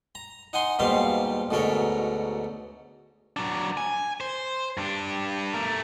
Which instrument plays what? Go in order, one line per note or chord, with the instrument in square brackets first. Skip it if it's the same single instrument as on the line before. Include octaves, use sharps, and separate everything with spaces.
[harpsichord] A#5
D#4 F#5 G#5 C6
D#2 G#2 B2 G3 C5 F5
D2 G#2 B2 A4 A#4 C#5
[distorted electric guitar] F#3 D4
G#5
C5
G2 D4
A3 A#4